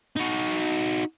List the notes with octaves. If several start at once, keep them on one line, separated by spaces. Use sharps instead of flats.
D#4 F#4